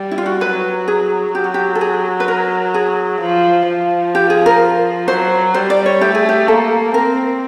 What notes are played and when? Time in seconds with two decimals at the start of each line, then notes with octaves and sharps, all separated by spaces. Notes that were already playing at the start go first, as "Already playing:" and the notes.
Already playing: G3
0.11 E4
0.18 F4
0.26 F#4
0.41 F#3 B4
0.88 G#4
1.34 F#3 G4
1.44 F#4
1.54 G4
1.75 A4
1.81 G#4
2.20 B4
2.28 A#4
2.74 G#4
3.22 F3
3.68 F3
4.15 G4
4.30 G#4
4.46 A#4
5.08 F#3 C5
5.54 G3 C5
5.70 D5
5.86 C#5
6.01 A3 G4
6.15 G#4
6.29 G4
6.48 A#3 A4
6.94 C4 A#4